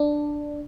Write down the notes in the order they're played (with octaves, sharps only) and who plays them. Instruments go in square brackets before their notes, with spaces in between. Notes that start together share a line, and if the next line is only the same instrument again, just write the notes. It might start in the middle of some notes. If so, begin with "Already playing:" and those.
Already playing: [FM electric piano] D4